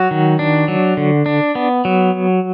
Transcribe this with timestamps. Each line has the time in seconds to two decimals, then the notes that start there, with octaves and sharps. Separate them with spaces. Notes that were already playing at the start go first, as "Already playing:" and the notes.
Already playing: F#3 F#4
0.11 D#3
0.39 D4
0.68 F#3
0.97 D3
1.26 D4
1.55 B3
1.85 F#3